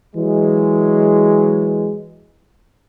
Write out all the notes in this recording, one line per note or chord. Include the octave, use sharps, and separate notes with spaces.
E3 F#3 G#3